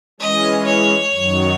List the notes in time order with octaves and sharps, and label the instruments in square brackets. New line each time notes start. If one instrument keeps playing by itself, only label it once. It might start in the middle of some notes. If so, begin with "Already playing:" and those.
[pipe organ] E3 G#3 C#4 [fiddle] D#5
[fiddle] C#5
[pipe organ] F#2 D#3 F#3